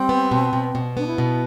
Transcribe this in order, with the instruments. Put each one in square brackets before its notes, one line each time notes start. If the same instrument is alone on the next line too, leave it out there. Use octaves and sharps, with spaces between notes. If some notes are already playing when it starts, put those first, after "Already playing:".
Already playing: [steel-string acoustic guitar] G3 [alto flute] C4
[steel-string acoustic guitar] B3
B2
B2
B2
[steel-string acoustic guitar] B3 [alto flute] D4
[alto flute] E4
[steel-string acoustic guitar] B2